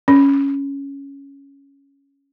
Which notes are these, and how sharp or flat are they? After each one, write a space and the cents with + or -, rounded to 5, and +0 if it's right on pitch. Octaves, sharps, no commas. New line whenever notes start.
C#4 +5